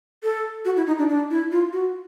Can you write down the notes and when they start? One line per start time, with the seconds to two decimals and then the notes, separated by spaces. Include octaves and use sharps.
0.23 A4
0.65 F#4
0.76 E4
0.87 D#4
0.98 D4
1.09 D4
1.31 E4
1.52 F4
1.73 F#4